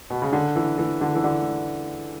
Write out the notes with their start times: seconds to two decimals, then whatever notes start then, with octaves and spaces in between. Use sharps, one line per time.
0.10 B2
0.22 C#3
0.33 D3
0.56 E3
0.78 E3
1.01 D3
1.15 E3
1.24 D3